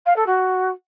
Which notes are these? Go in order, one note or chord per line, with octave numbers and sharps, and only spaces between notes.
F5
A4
F#4